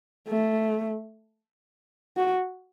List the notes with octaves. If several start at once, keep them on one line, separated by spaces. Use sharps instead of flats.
A3
F#4